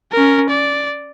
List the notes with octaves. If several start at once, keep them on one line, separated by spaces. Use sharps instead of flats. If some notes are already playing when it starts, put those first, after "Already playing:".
C#4 A#4
D5